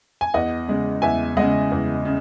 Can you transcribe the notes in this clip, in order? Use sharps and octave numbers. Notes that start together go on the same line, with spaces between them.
G#5
E2 D#5 F#5
C#3 G#3
E2 E5 G#5
C#3 G#3 D#5 F#5
E2
C#3